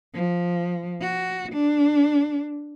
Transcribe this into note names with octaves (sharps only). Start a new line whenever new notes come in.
F3
F#4
D4